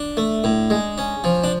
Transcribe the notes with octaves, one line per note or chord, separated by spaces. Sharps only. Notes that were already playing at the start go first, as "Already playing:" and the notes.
Already playing: D4
A3
A2
G#3
C#4
F3
D4